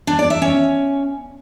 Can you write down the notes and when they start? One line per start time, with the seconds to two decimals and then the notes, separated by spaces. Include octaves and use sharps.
0.07 D4
0.19 D5
0.30 E5
0.42 C#4